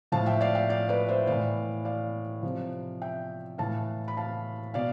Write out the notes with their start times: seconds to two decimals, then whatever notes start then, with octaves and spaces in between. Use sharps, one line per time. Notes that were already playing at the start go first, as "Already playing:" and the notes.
0.12 A2 F3 F5 A5
0.26 E5 G5
0.41 D5 F5
0.55 E5 G5
0.69 D5 F5
0.89 B4 D5
1.09 C5 E5
1.27 A2 E3 D5 F5
1.85 D5 F5
2.43 C3 F3
3.02 E5 G5
3.58 A2 E3 F5 A5
4.08 B5
4.17 F5 A5
4.74 B2 D5 F5